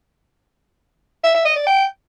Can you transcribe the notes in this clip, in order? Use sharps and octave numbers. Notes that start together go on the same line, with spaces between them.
E5
E5
D#5
D5
G5